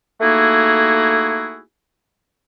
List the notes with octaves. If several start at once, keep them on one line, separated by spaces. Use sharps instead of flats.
A3 A#3 D#4 E4 F#4 G#4